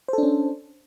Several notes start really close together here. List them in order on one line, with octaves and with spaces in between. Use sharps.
C5 A4 D4 C#4